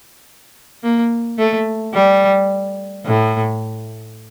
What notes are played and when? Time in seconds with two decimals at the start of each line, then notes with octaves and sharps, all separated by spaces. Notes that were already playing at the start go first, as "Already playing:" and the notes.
0.83 A#3
1.39 A3
1.94 G3
3.06 A2